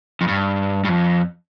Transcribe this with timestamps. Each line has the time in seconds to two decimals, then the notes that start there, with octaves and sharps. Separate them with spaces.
0.21 F2
0.28 G2
0.85 G2
0.89 F2